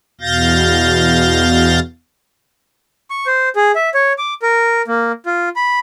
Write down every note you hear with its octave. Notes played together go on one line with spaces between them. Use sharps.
E2 B2 F5 G6 A6 A#6
C#6
C5
G#4
E5
C#5
D6
A#4
A#3
F4
B5